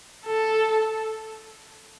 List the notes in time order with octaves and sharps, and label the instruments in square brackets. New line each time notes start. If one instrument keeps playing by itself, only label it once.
[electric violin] A4